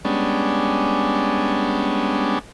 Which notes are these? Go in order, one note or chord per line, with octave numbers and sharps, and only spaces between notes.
G3 G#3 B3 C#4 D4